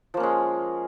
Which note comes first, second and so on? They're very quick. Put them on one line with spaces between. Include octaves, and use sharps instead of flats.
F3 A#3 C#4 G#3